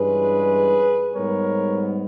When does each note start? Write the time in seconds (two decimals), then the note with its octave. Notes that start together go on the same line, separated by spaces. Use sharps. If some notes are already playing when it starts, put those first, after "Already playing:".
Already playing: G2 E3 G#3 C#4 G#4 B4
1.14 G#2 G3 B3 A#4 C#5